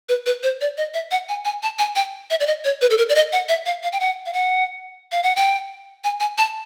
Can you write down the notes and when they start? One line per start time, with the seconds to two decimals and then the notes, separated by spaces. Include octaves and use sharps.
0.09 B4
0.26 B4
0.43 C5
0.61 D5
0.77 D#5
0.94 E5
1.11 F#5
1.29 G#5
1.45 G#5
1.63 A5
1.79 G#5
1.96 G5
2.30 E5
2.40 D5
2.47 D#5
2.64 C#5
2.81 B4
2.90 A4
2.98 A#4
3.09 D5
3.15 D#5
3.33 F#5
3.49 E5
3.66 F5
3.83 F5
3.92 G5
4.00 F#5
4.26 F5
4.33 F#5
5.12 F5
5.23 F#5
5.36 G5
6.04 G#5
6.20 G#5
6.38 A5